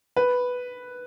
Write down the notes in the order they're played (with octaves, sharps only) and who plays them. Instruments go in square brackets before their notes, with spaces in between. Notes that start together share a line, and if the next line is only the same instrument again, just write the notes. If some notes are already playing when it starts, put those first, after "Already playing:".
[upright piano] B4